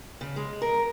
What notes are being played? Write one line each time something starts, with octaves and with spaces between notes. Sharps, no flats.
C#3
G#3
A#4